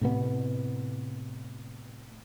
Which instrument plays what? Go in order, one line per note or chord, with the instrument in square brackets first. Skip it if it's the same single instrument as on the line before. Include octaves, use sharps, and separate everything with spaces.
[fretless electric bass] A2 C3 B3